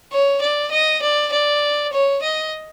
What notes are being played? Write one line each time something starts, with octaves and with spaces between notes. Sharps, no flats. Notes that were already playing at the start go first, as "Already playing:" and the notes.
C#5
D5
D#5
D5
D5
C#5
D#5